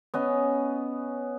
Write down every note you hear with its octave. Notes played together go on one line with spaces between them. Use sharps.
B3 C#4 D#5